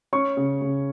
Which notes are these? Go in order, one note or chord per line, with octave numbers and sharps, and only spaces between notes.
C#4 C#6
C#3
C#3